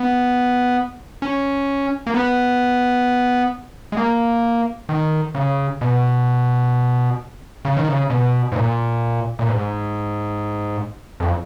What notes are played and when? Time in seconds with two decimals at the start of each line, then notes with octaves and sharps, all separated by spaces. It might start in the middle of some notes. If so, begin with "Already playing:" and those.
Already playing: B3
1.22 C#4
2.07 A#3
2.14 B3
3.92 G#3
3.97 A#3
4.89 D#3
5.35 C#3
5.81 B2
7.65 C#3
7.77 D#3
7.88 C#3
8.10 B2
8.52 G#2
8.56 A#2
9.39 A#2
9.48 G#2
11.20 F2